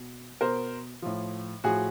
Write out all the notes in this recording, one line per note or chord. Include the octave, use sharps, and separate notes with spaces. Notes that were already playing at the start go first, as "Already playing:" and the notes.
Already playing: B2
B2 A#4 C5
A2 F3
A2 F3 F#4 G#4